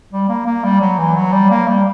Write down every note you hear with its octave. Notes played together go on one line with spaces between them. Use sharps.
G3
A#3
A#3
G3
F#3
E3
F#3
G3
A#3
G3